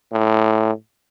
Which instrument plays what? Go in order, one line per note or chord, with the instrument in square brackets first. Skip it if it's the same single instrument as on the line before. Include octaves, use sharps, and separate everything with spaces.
[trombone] A2